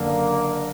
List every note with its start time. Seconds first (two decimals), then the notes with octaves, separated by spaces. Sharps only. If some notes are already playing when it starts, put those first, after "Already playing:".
Already playing: F#1 F#2 D3 A#3